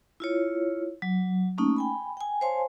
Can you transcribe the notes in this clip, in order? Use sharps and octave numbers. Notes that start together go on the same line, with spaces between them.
E4 F4 C#5
F#3
A3 A#3 C#4 D#4
G5 G#5 B5
G5 G#5
C5 C#5 F5 G#5 A5 C6